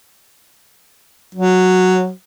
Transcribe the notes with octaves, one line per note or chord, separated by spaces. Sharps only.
F#3